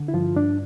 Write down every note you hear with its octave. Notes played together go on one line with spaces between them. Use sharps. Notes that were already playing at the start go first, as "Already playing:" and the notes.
Already playing: D3
E4
G2 F3 F4
G2 D4